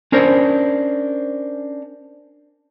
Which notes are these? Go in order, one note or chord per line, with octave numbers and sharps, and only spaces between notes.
C#4 D4 A#4 C5